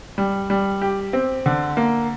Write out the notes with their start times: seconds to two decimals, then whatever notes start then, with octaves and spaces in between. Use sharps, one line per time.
0.18 G3
0.50 G3
0.82 G4
1.13 C4
1.46 D3
1.77 A#3